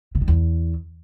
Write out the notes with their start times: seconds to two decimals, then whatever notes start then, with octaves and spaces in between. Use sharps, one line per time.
0.15 C3
0.21 D#3
0.28 E2